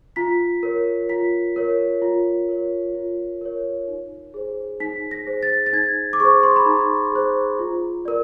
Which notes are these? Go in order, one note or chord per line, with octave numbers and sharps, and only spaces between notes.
F4 B6
A#4 C#5
F4 B6
A#4 C#5
F4
A#4 C#5
F4
A#4 C#5
D#4
G#4 C5
D#4 B6
A#6
G#4 C5
A6
A6
D#4 G#6
D6
G#4 C5 C#6
C6
B5
D#4 A#5
G#4 C5
F4
A#4 D5